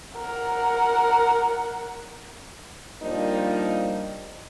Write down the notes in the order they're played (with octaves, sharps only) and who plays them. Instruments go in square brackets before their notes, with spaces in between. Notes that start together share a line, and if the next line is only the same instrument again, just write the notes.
[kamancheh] A#4 F#5
[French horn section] F3 G3 A#3 D4 D#4